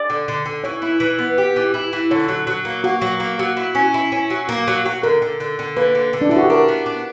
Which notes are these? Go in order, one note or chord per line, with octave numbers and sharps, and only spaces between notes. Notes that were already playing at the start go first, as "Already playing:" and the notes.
Already playing: D5
D3
D3
D3
E3 C#5
E4
E3
B3
G4
E3
E4
E3
D3 C#5
F#3
F#3
A#3
A#3 F#4
F#3
A#3
F#3
E4
C#4
E4
C#4
F#3
A#3
F#3
F#3
D3 A#4
D3
D3
D3
A#3 B4
D3
D3
D4
D3 E4
F#4
G4
D4 A#4
B3
D4